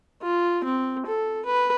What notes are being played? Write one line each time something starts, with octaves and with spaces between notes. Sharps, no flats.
F4
C4
A4
B4